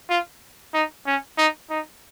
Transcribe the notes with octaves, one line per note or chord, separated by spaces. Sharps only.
F4
D#4
C#4
D#4
D#4